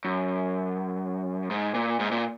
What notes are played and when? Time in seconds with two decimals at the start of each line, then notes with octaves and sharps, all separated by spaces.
0.05 F#2
1.51 G#2
1.74 A#2
2.00 G#2
2.11 A#2